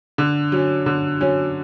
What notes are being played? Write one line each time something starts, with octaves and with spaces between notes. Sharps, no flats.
D3
F#3 C#4
D3
F#3 C#4